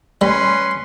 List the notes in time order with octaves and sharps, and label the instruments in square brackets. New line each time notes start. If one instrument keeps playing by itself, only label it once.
[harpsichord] G3 [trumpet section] C#4 B4 C6